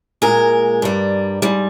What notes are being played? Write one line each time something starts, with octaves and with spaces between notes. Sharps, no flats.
A#2 G#3 A#4
G2 G3
G#2 G3